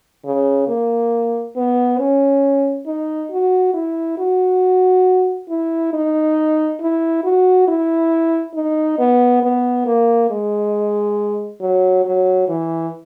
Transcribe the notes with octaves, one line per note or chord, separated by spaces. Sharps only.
C#3
A#3
B3
C#4
D#4
F#4
E4
F#4
E4
D#4
E4
F#4
E4
D#4
B3
B3
A#3
G#3
F#3
F#3
E3